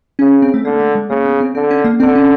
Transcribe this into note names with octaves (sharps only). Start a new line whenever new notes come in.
C#3 C#4
C4
A3
D3 A#3
A3
G#3
C#3 A#3
B3
C4
D3 C4
C#4
A#3
D3 C4
C#4